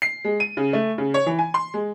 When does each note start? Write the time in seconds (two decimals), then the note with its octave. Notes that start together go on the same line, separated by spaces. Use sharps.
0.02 C7
0.25 G#3
0.40 D#7
0.57 C#3
0.73 A3
0.98 C#3
1.14 C#5
1.26 E3
1.39 G#5
1.54 C6
1.74 G#3